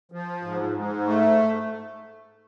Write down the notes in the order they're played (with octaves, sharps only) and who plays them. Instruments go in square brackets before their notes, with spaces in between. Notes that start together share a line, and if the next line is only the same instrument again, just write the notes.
[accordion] F3
G#2
G#2
A3